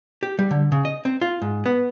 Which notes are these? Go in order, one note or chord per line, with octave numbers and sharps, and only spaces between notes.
G4
G3
D3
C#3
D#5
C4
F4
G#2
B3